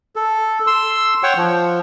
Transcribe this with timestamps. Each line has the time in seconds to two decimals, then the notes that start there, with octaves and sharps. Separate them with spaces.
0.16 A4
0.67 C6 E6
1.23 C#5 F#5 G5 C#6
1.37 F3